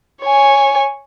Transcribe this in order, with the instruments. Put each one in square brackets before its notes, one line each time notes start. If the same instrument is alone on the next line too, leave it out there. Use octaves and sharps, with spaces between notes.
[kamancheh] C#5 G#5